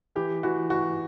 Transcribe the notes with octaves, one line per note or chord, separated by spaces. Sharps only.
E3 G4
E3 F#4
E3 F#4